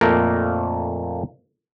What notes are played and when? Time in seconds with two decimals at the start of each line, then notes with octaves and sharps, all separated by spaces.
0.01 F2 A#2 A3 A#3 A#4